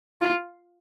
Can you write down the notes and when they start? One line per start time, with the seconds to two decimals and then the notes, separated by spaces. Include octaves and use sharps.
0.21 F4